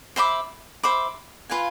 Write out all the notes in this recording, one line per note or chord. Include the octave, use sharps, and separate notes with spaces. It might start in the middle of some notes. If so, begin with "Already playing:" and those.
C5 E5 B5 D6
C5 E5 B5 D6
F4 B4 F5 G#5